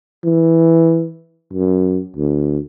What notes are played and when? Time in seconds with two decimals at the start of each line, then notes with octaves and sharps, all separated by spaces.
0.24 E3
1.53 F#2
2.17 D2